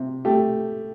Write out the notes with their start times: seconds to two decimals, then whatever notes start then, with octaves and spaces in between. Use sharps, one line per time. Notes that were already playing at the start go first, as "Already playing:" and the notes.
Already playing: C3
0.25 A3 G4